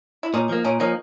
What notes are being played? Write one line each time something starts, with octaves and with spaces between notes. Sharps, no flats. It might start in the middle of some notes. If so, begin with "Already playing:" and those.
E4
A#2 C#4 D#4
F3 A#3
A#2 C#4 D#4
F3 A#3 C#4 D#4